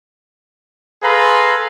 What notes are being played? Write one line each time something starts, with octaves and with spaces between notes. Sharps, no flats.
G#4 A4 B4 F5 A#5 C6